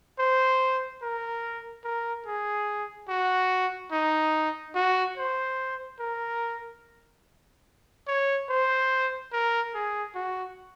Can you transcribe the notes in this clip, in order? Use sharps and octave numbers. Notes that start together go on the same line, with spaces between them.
C5
A#4
A#4
G#4
F#4
D#4
F#4
C5
A#4
C#5
C5
A#4
G#4
F#4